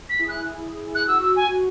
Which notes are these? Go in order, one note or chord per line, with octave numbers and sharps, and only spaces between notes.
B6
E4 G#4
F#6
F#6
F#4 E6
E6
G#5